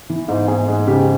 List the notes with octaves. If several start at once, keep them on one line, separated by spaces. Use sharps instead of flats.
E3
G#2
G#2 G#4
G#3
C#3 G4